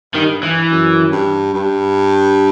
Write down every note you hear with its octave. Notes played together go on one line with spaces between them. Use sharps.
G2 D#3
E3
F#2
G2
G2